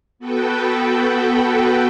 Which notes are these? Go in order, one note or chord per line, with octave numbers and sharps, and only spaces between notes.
B3 F#4 A4 B4 G5